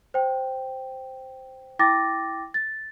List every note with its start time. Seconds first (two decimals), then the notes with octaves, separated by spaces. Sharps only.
0.14 C5 G5
1.79 E4 G5 D6 A6 A#6
2.54 A6